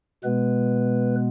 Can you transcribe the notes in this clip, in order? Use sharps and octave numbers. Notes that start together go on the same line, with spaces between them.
B2 G#3 B3 B4